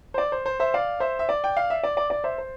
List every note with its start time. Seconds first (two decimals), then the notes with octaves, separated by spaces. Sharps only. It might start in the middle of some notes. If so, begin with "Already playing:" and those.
0.14 C5
0.18 D5
0.32 C5
0.46 C5
0.60 C5 E5
0.74 D5 F5
1.00 C5 E5
1.19 E5
1.29 D5
1.44 G5
1.57 F5
1.70 E5
1.83 D5
1.97 D5
2.10 D5
2.24 C5 E5
2.38 C5